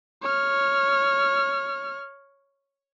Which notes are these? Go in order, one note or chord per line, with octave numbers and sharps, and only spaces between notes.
C#5 F6